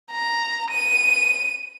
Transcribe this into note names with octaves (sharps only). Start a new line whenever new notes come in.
A#5
D#7